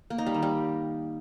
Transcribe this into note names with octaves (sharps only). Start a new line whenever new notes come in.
A#3
D#4
G3
D#3
G3